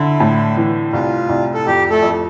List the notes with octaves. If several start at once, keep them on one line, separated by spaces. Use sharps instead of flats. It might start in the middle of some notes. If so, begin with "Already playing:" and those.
Already playing: D3 E4
A2
E3
C2 F4
C2
A4
F2 G4
A3 A4
F2